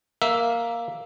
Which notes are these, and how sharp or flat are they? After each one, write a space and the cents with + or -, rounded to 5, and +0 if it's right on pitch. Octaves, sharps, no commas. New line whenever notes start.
A#3 +0 E5 +0